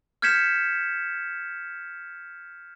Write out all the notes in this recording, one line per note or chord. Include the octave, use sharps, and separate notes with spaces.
F6 G6 G#6 B6 C#7 E7